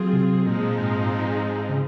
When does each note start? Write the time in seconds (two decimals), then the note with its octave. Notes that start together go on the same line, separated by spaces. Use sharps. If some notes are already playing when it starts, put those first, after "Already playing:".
Already playing: F#3 C4 F4 G#4
0.13 C3
0.47 A#2 F3 G#3 C4 D#4
0.79 G#2
1.69 C#3